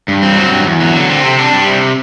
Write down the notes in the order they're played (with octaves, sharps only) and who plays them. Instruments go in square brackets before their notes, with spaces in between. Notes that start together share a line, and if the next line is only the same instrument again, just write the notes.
[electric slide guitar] G2
C4
F#3
G2
E2
F#3
D3
C4
C3
D4
G3
C3